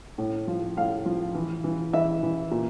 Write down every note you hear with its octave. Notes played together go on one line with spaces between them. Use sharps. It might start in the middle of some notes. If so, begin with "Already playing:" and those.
A2
F3
A2 F5
F3
E3
E3
E3 E5
E3
A#2